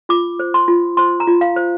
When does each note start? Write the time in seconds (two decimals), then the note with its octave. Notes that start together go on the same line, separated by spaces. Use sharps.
0.09 F4 D6
0.40 C5
0.54 C6
0.68 F4
0.97 C5 C6
1.20 A#5
1.27 F4
1.41 F5
1.56 C5